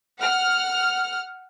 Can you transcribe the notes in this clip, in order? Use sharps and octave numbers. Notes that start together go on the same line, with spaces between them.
F#5 F6